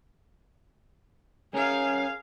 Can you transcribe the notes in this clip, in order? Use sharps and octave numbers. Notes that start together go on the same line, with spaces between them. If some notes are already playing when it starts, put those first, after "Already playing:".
C#4 G#4 A#4 F5